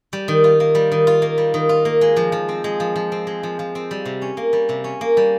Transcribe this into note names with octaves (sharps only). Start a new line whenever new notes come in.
G3
D#3
F4
A#3
G3
D#3
F4
A#3
G3
D#3
F4
A#3
G#3
F3
F3
C4
G#3
F3
F3
C4
G#3
F3
F3
C4
G3
C3
C#4
A#3
G3
C3
C#4
A#3
G3